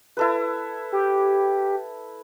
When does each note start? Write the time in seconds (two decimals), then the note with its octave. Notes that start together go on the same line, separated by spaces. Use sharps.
0.17 E4 A4 B4
0.92 G4